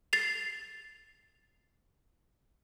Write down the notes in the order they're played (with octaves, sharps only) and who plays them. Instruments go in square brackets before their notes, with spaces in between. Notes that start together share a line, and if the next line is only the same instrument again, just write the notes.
[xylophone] A6 C7 F7